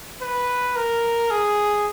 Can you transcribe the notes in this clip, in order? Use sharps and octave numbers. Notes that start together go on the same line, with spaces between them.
B4
A#4
G#4